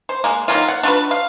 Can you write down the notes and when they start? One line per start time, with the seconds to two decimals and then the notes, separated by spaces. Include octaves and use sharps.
0.09 C5
0.24 G#3 A#3
0.48 D#3 F#3 A#3 F4
0.68 F#5
0.83 D4 F4 F#4 B4
1.11 F5